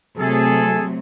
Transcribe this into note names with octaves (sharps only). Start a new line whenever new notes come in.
C3 F#3 A3 G#4 A4